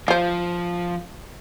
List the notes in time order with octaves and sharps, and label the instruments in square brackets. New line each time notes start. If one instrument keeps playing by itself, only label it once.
[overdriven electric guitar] F3 [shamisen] F4 C5